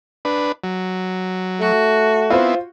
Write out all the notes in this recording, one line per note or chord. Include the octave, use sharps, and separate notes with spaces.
D4 B4
F#3
A3 F#4
B3 C4 E4 F4 C5